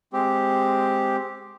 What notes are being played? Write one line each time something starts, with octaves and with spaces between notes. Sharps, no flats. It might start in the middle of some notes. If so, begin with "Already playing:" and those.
G#3 C4 G4